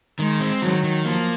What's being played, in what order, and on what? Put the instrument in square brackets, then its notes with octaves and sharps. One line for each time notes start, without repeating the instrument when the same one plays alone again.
[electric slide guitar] D#3 [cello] G#3
[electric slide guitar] C4
[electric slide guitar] D#3 [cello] F#3
[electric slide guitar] D#3
[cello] F3 [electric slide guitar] A#3